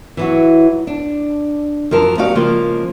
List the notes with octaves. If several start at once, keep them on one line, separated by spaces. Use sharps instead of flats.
E3 F#3 F#4
D4
F#2 F3 A#4 A5
D#4 F#4 G4 D5 F5
C#3 F3 G#3 A#3